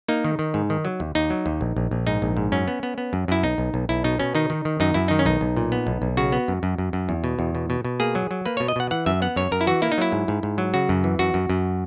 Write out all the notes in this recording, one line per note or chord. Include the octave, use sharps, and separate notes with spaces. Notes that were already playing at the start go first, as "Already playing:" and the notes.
A#3 D#4
D#3
D#3
G#2
D#3
F#3
D#2
D#2 D#4
F#3
D#2
A#1
A#1
A#1
G#2 D#4
A#1
G#2
F#2 C#4
B3
B3
B3
F#2
F#2 E4
B1 D#4
B1
B1
B1 E4
B2 D#4
B2 C#4
D#3 D#4
D#3
D#3
F#2 D#4
F#2 E4
D#3 D#4
C#4
B1 D#4
B1
A#2
B3
B1
B1
C#3 F#4
B3
F#2
F#2
F#2
F#2
E2
B2
E2
B2
B2
B2
A#3 G#4
F#3
F#3
A#3 B4
B2 C#5
D#5
B2 F#5
E3 F#5
F#2 E5
B3 F#5
F#2 C#5
F#2 A#4
E4
E3 F#4
A#3 E4
D#4
F#3 E4
G#2
G#2
G#2
F#3
C#3 F#4
F#2
E3
F#2 F#4
F#2
F#2